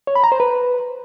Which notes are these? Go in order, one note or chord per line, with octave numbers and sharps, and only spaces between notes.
C#5
B5
A#5
C5
B4